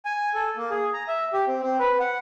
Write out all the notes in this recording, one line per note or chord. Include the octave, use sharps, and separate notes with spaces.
G#5
A4
A#3
G#4
A#5
E5
G4
C4
C4
B4
F#5